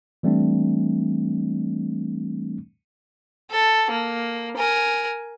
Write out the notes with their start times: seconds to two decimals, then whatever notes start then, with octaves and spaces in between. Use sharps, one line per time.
0.23 E3 G3 A3 C4 D4
3.51 A4
3.91 A#3
4.57 A#4 G#5